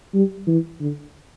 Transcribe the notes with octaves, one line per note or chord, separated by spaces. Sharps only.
G3
E3
D3